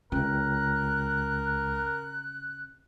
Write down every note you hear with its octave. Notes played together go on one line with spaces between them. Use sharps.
C#2 C#3 A#4 G5 F#6